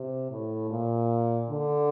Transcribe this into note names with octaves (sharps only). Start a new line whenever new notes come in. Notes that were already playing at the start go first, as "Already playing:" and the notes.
Already playing: C3
A2
A#2
D3